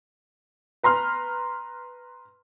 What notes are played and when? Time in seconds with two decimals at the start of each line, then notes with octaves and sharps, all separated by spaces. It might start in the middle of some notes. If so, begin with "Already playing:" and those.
0.83 B4 A#5 C6 F6